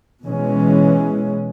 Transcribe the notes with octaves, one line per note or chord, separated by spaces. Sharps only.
B2 E3 G#3 C#4